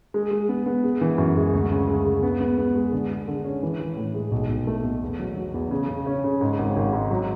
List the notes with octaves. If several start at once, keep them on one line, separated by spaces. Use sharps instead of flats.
G#3
G#3
B3
B3
G#3
E3
F#2
G#3
D2
C#3
G#3
G#3
B3
B3
B3
G#3
D3
G#3
D3
C#4
E3
E3
A2
G#3
B1
B1
A3
B2
E2
F#3
F#3
E2
C#3
C#3
C#4
C#3
G#2
G#1
G#1
G#2
F#3